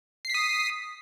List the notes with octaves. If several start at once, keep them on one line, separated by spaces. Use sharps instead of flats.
D#6 B6 C7